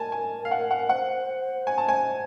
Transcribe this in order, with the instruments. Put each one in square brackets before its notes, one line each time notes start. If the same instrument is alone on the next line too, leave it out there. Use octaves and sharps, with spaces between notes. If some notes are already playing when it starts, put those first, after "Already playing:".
Already playing: [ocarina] A#4 [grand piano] G#5 A5
[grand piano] G#5
F5
F#5
F#5
[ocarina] C5 [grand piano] F#5
[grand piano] G#5
A5
G#5